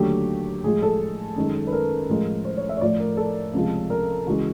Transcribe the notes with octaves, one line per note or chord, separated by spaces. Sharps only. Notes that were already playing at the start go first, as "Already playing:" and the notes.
Already playing: D#2 D3 F#3 A3 G4
A2 F3 G#3 G#4
A4
F#2 D#3 G#3
B4
A#4
A2 F3 G#3
C5
C#5
E5
C#5
A2 F3 A3 D5
A#4
A4
C#2 C3 F3 G#3
A#4
C#2 C#3 E3 G#3 F#4